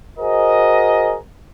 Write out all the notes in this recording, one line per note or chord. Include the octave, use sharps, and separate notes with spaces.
F#4 G#4 A#4 C5 D#5